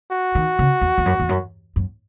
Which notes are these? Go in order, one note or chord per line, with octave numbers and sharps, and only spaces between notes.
F#4
D#3
C#3
E2
E2
F#2
E2
F#2
F#2